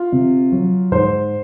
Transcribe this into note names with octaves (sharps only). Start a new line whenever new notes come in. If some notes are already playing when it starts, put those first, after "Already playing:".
Already playing: F4
C3
F#3
G#2 C5 C6